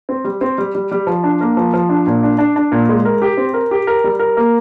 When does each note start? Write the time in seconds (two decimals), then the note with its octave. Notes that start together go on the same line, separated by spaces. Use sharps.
0.09 C4
0.24 G3
0.41 C4
0.58 G3
0.75 G3
0.92 G3
1.07 F3
1.23 D4
1.41 A#3
1.57 F3
1.74 F3
1.89 D4
2.07 A#2
2.23 D4
2.38 D4
2.56 D4
2.72 A#2
2.89 G#3
3.05 A#4
3.22 G4
3.37 C4
3.54 A#4
3.71 G4
3.87 A#4
4.04 G3
4.19 A#4
4.37 A#3